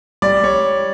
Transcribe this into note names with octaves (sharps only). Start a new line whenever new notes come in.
G3 D5
G3 C#5